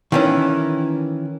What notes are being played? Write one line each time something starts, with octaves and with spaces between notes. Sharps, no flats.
D#3 E3 C#4